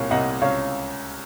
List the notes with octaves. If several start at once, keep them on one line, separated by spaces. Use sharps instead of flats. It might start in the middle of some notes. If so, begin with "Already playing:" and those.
Already playing: C2 A#2 C#5 F5
C2 D#5 F#5
C#2 C#5 F5